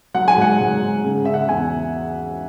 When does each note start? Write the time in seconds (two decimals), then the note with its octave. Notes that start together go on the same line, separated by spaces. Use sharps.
0.14 F#3 F#5
0.28 G#5
0.37 G#2 F#5
0.60 G#2
0.82 G#2
1.04 C#3
1.25 C#3 E5
1.34 F#5
1.49 E2 G#5